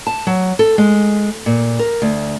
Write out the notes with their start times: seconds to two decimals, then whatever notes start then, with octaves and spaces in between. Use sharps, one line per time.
0.07 A5
0.27 F#3
0.59 A4
0.78 G#3
1.46 A#2
1.79 A#4
2.02 D2